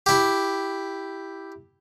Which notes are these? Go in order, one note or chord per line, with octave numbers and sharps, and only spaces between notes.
E4 G4